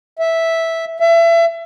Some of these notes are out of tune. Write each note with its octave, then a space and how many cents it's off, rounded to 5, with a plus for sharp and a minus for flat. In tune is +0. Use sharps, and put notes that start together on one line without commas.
E5 -5
E5 +30